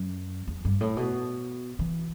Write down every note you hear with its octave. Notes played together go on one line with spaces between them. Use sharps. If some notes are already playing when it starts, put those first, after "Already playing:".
Already playing: F#2
E2
G2
A2
B2
E3